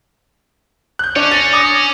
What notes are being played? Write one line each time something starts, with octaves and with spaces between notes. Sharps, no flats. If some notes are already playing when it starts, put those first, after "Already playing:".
F#6 G6
C#4 D4
A6 A#6 F7
D6 D#6 A#6